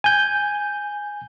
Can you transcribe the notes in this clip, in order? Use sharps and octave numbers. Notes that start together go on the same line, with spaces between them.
G#5 G6